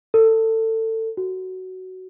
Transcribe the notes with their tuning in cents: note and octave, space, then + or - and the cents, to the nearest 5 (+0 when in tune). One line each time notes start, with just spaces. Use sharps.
A4 +25
F#4 +10